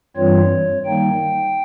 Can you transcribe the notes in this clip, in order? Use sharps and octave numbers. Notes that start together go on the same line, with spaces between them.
G2 E3 G3 C4 F4 C#5
D#3 G3 A#3 D#4 G5